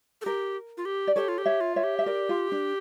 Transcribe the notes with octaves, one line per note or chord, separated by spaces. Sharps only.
A4
G4 A#4
F4
G4
D5
G4 A4 C#5
F4
G4
C#5 E5
F4
C#5 E5
G4
E5
A#4 D5
F4
D4